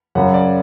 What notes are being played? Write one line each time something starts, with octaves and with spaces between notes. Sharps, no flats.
F#2 C#3 F#3 C#4 F#5
D5